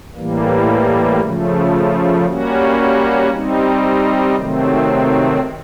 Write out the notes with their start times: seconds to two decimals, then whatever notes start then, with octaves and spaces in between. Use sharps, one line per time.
0.15 A2 E3 G3 A#3
1.20 C#3 F3 A3
2.26 G3 A#3 C#4 F#4
3.31 G3 C4 D#4
4.36 C3 D#3 F#3 A3 C4